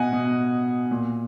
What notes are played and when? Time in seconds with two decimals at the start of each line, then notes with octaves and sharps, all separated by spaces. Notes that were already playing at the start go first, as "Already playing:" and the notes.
Already playing: B2 D#5 F#5 G#5
0.13 B2
0.91 A#2